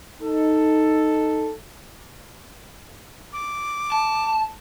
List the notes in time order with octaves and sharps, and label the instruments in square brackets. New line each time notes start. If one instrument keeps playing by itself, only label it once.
[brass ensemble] D#4 A4
[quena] D6
[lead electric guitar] A5